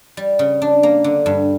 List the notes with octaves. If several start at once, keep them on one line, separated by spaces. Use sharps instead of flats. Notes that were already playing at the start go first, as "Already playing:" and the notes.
G3
C#3
D4
A#3
D3
G2